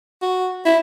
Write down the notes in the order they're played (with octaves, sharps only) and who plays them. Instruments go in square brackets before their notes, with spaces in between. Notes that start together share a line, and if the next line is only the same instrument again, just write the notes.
[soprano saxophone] F#4
E4